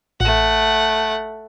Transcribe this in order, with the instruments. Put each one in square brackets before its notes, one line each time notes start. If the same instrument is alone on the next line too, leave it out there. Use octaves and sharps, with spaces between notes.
[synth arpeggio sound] A1 [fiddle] A3 F#5